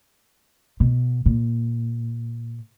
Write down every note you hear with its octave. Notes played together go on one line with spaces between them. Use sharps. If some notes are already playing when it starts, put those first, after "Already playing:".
B2
A#2